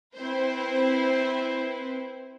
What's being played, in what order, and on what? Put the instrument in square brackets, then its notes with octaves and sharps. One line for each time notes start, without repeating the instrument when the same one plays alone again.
[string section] C4 E4 B4 C5